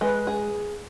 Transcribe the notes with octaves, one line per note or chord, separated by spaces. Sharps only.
G#3 B4
G#4